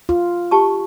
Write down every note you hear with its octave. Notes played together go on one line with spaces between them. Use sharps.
F4
G4 A5 C#6